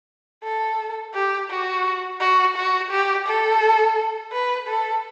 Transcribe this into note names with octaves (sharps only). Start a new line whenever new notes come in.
A4
G4
F#4
F#4
F#4
G4
A4
B4
A4